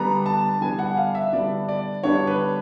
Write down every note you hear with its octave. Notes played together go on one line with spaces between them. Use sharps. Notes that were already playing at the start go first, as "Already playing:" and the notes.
Already playing: D3 G3 B3 D4 A#5
A5
D3 G3 B3 D4 G#5
F#5
F5
E5
D3 G3 B3 D4 D5
D5
D3 G3 B3 D4 C#5
B4